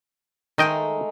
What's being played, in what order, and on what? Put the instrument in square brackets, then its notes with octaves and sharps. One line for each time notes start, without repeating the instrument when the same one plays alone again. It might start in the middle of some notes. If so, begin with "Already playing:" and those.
[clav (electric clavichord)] D#3 D#5 G5 [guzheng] G#3 A3 D#4